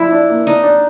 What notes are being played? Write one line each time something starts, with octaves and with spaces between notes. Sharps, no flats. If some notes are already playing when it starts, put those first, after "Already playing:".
Already playing: F3 D4 E4
D4
A#3
D4 D#4
D4